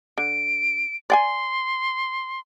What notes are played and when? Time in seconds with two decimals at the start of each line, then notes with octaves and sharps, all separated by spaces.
0.18 D3 D7
1.10 D5 G5 G#5 C6